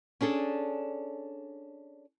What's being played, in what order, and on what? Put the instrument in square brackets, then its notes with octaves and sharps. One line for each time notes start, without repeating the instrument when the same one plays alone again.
[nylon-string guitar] C#4 D4 G#4 A4